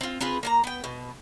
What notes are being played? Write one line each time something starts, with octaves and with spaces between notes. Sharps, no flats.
C4 F4
C4 F4 G#4 B4
A#3 G#5 A#5
B3 G5
B2